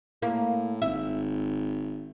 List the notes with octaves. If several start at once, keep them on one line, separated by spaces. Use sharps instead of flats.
A2 A#3
G#1 E5